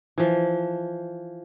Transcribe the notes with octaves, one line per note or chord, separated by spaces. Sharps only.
E3 F3